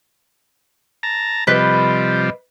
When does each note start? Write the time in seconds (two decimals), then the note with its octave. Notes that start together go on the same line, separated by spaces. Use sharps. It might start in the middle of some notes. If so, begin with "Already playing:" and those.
1.03 A5 A#5
1.47 C3 F3 G3 B4 D#5